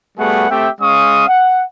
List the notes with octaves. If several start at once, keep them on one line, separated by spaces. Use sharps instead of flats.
G3 A3 B3 F#4 G#4 F#5
A3 C4 G4 E5 G5
G#3 C#4 F5 C#6 D#6
F#5